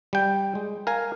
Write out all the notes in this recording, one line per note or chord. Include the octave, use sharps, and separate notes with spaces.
G3 G5
G#3
A#4 F5 G#5